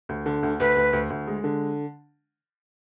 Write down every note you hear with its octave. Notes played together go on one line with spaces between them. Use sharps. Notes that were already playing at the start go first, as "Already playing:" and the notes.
D2
D3
D2
D2 B4
D2
D2
D2
G#3
D3